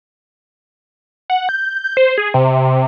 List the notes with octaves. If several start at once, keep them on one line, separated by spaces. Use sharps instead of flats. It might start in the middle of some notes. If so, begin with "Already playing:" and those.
F#5
G6
G6
C5
G#4
C3